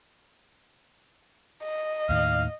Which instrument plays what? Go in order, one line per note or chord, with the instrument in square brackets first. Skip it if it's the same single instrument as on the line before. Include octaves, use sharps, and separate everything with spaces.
[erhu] D#5
[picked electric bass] D#2 A2 D#3 [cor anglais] F5